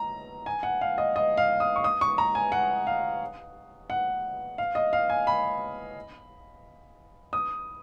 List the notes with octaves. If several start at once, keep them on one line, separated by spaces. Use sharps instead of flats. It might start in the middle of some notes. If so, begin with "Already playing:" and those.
Already playing: A#5
G#5
F#5
F5
D#5
D#5
F5
D#6
C#6
D#6
C#6
A#5
G#5
F#5
F5
F#5
F5
D#5
F5
G#5
B5
D#6